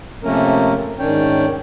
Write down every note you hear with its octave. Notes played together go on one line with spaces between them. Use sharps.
C3 F3 A3 A#3 C#4 A#4
G#2 D#3 C#4 D4 C#5 G5